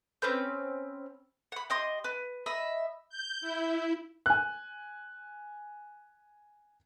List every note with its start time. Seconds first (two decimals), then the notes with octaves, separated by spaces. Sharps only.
0.22 C4 C#4 B4 G6
1.52 F#5 B5
1.70 G4 D#5 C6
2.04 B4
2.46 D#5 E5 B5
3.09 G6
3.41 E4
4.26 G#5 F#6